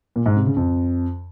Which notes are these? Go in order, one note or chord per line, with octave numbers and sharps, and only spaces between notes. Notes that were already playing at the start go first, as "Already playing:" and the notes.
A#2
G#2
C3
C#3
F2